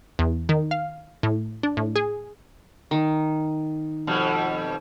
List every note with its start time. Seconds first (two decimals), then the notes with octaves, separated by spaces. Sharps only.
0.19 E2
0.49 D#3
0.71 F5
1.23 A2
1.63 D4
1.77 A2
1.96 G#4
2.91 D#3
4.07 F2 B2 G3